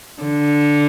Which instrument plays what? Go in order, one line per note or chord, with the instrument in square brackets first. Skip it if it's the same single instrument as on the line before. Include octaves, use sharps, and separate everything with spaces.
[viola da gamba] D3